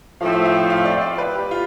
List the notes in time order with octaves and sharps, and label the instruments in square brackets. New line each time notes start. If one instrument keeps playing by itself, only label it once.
[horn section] A2 F3 A3 C4 [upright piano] F5
[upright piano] E5
F5
G5
F5
D5
D5
B4
G4
F4